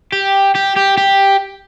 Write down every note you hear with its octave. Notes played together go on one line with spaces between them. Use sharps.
G4
G4
G4
G4